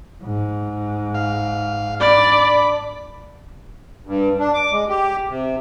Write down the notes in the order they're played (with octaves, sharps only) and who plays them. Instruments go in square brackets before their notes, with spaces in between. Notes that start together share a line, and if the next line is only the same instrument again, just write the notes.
[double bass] G#2
[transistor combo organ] F5
[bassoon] D4 [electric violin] D5 [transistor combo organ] B5 D6
[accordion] G2
D4
D6
G#3
G4
C3